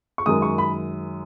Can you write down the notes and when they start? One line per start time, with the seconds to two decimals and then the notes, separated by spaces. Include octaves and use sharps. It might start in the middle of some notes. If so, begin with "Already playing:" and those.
0.18 C#6
0.26 F#2 D#3 G#3 D#6
0.42 C#6
0.58 B5